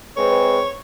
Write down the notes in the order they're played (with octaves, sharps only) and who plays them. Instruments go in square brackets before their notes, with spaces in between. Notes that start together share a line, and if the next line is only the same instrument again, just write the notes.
[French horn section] G#3 C4 B4 [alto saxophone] C#5